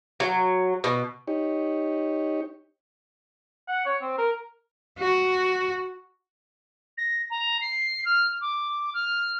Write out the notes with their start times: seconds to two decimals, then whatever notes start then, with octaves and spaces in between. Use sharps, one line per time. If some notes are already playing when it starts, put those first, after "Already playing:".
0.20 F#3
0.84 B2
1.27 D#4 G4 C#5
3.68 F#5
3.85 C#5
4.02 C4
4.18 A#4
4.99 F#4
6.98 A#6
7.30 A#5
7.61 C7
8.05 F6
8.41 D6
8.94 F6